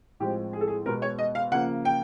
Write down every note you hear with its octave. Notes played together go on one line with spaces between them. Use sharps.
A2 F3 G#3 C4 G4
G#4
A4
G#4
B2 G#3 B3 A#4
C#5
D#5
F5
C#3 F3 A#3 F#5
G5